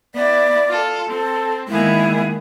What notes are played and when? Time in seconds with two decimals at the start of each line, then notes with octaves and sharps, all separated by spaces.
0.15 B3 E4 D5
0.69 F4 A4
1.09 C4 A4
1.68 D#3 G#3 A#3 B3 E4 G#4